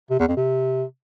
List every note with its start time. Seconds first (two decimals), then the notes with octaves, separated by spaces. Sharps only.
0.10 C3
0.19 E2
0.28 F2
0.37 C3